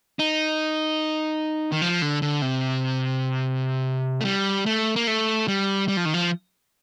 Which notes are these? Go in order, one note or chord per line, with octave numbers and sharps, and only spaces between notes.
D#4
D#3
F3
D3
D3
C3
A3
G3
A3
A#3
A3
G3
G3
F3
D#3
F3